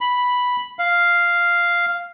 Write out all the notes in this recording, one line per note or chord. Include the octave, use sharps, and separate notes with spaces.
B5
F5